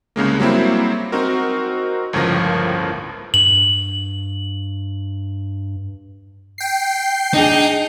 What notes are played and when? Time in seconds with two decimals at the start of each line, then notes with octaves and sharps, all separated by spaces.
0.16 C2 C#3 G#3 A#3
0.40 F#3 G3 A#3 C4 E4
1.12 C4 D#4 F#4 A#4
2.13 G1 C#2 A2 F3 A#4 A#6
3.34 G2 F#7
6.58 G5 C7
7.34 D4 D#4 G#4